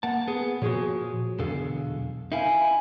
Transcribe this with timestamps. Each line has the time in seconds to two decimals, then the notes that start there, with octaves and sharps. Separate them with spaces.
0.03 A#3 F#5 A5
0.28 B3 G#4
0.62 A#2 F3 F#4 G#4 C#5
1.39 B1 E2 D3 G#4 A4 F5
2.32 D#4 E4 E5 F5 G#5